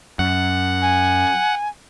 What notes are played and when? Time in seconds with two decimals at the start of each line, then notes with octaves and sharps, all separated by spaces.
0.19 F#2 F#5
0.81 G#5